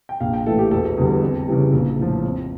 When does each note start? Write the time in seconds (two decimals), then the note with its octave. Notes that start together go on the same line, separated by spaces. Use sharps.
0.09 G5
0.20 A#1 F5
0.34 G5
0.46 A2 E3 A3 A4
0.59 G4
0.71 E1 A4
0.98 E2 D3 G3
1.23 F2
1.48 C#3 E3 G3
1.73 A#1
1.99 A2 F3
2.24 F2